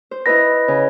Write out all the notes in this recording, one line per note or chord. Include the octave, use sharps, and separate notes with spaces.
C5
E4 B4 D#5 B5 A#6
C#3